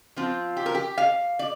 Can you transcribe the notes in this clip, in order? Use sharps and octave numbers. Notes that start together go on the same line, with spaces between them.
F3 C4 F4
G4
A#4
G4
F5
D5